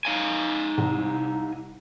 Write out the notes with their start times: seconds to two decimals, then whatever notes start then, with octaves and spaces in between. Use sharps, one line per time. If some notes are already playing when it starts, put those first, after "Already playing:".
0.05 D#4 F5 G#5
0.78 C2